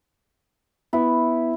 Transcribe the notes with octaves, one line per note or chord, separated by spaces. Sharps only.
B3 E4